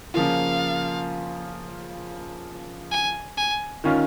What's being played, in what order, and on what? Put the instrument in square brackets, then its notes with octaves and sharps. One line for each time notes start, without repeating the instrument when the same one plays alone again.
[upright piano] C#3 F3 A#3 F4 [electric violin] F5
[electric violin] G#5
G#5
[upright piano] D#3 C#4 F4